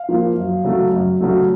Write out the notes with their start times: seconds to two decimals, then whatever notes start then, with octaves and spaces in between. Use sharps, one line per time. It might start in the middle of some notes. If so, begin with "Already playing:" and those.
Already playing: F5
0.09 F3 A#3
0.37 F#2
0.65 C#3 F#3 A3
0.93 F#2
1.21 C#3 F#3 A3